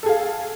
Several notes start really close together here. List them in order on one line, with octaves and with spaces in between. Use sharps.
A4 G#4 F5